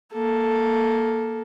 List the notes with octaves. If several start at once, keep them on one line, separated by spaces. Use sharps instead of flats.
A#3 A4